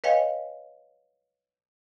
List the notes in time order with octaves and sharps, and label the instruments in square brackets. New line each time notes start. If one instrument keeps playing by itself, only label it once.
[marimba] B4 C#5 D#5 F5 G5 G#5